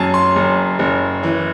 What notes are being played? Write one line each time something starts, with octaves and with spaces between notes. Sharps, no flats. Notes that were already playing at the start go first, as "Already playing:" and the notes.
Already playing: F#1 F#2 G#5 A5
C6
F#1
F#1
E3